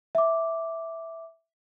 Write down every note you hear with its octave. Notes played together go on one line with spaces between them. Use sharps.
E5 D6